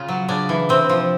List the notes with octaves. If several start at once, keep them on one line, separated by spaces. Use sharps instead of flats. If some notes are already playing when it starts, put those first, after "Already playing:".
Already playing: C#3 F4
F#3
C#3 D4
E3
C3 C4
F3